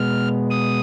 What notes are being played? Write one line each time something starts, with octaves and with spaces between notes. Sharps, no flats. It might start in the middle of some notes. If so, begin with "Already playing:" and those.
Already playing: B2 G#3 B3 F6
D#6